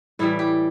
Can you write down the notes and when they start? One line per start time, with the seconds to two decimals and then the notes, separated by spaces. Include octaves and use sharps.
0.19 A2 E3 G3 E4
0.39 G4